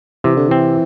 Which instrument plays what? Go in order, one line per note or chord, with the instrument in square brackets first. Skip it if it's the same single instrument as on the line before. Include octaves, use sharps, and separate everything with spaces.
[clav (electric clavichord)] C3 [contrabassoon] E3
[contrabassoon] D3
[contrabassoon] E3 [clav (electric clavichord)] C4